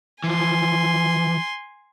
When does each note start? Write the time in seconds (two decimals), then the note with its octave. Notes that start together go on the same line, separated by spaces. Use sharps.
0.24 E3 F3 G#5 C6